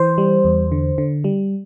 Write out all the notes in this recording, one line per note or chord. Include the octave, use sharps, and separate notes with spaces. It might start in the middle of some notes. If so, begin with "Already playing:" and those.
Already playing: E3 C5
G3
E2
D3
D3
G3